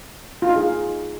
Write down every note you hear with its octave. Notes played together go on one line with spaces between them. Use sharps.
F4
D#4
G#4